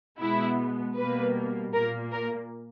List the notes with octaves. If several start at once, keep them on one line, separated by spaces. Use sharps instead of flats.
B2 G#3 B3 E4
B2 G3 A#3 B4
A#2 A#3 A#4
A#4